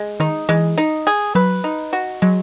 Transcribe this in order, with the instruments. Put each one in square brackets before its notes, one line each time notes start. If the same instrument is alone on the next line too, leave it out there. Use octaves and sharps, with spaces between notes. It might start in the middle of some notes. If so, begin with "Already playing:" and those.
Already playing: [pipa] G#3
[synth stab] D#3 [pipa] D#4
[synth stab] E3 [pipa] G#3
[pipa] D#4
G#4
[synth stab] F#3 [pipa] B4
[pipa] D#4
F#4
[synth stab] F#3 [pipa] G#3